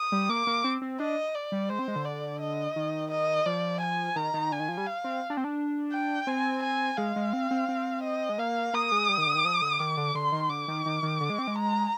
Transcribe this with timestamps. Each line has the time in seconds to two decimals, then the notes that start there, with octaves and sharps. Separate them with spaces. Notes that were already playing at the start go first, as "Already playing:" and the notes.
Already playing: D#6
0.12 G3
0.29 A#3 D6
0.47 A#3
0.64 C4
0.82 C4
1.00 D4 D#5
1.35 D5
1.52 G3
1.69 G#3 C5
1.79 C4
1.88 G#3
1.96 D3
2.05 D5
2.41 D#5
2.76 D#3
3.11 D#5
3.46 F3 D5
3.81 G#5
4.16 D#3 A#5
4.34 D#3
4.52 D3 G#5
4.60 D#3
4.69 F3
4.77 G3
4.87 F5
5.04 C4
5.30 D4
5.37 C4
5.44 D4
5.92 G5
6.27 C4 G#5
6.63 G#5
6.97 G#3 F5
7.16 G#3
7.33 C4
7.51 C4
7.68 C4
8.03 D#5
8.29 G#3
8.38 A#3 F5
8.74 A#3 D#6
8.92 G#3
9.09 G3
9.18 D#3
9.27 D3
9.35 D#3
9.45 F3
9.62 D3
9.79 D#3 D6
9.97 D3
10.15 D3 C6
10.32 D#3
10.49 D3 D6
10.68 D#3
10.86 D#3
11.03 D#3
11.20 D3
11.30 G#3
11.39 C4
11.47 G#3
11.56 A#5